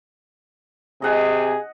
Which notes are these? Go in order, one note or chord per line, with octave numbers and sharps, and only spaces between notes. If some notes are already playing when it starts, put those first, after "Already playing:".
C3 G#4 D#5 F#5